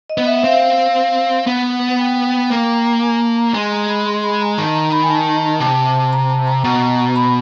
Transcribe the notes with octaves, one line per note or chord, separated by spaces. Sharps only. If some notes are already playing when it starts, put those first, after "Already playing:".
D#5
B3
E5
E5
C4 F5
B3 F#5
G5
A#3
G#5
A5
A#5
G#3 C6
A#5
B5
C6
B5
A#5
D#3 A5
A#5
B5
G#5
A5
C3 A5
A#5
A5
A#5
B2 A#5
B5